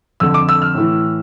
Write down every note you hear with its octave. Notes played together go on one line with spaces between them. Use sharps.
F2 D3 E6
D6
E6
F6
A2
E3